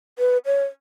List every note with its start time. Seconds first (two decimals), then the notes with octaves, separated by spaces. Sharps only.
0.19 B4
0.46 C#5